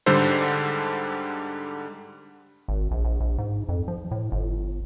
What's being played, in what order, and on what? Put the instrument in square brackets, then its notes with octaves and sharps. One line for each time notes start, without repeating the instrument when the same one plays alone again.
[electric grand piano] G#2 D3 G3 A4 C5
[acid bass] G#1
A#1
A#1
A#1
G#2
F2
F3
A2
G1